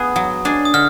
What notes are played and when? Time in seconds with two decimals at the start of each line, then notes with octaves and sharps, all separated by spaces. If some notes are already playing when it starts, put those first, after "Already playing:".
Already playing: B3 G#4 D#6
0.16 F#3
0.45 D4 G#4
0.65 D#6
0.74 D3 F6